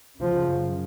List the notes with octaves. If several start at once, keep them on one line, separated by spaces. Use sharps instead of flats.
F#2 C#3 F3